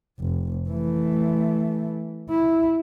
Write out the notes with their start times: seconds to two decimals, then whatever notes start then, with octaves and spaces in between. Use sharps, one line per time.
0.20 F1
0.70 E3 A3
2.30 E4